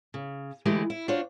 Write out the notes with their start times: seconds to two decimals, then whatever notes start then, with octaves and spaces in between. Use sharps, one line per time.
0.14 C#3
0.65 D3 E3 G#3 A3 G4 B4
0.90 E4
1.08 D4 F4 F#4 C5 C#5